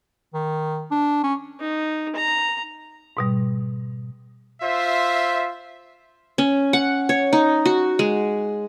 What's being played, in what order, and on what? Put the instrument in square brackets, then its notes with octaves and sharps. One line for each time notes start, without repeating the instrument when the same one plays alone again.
[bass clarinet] D#3
D4
C#4
[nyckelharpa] D#4
A#5
[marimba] G#2 B2 G3
[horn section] F4 C5 E5
[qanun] C#4
F#5
C#5
D#4
F#4
G#3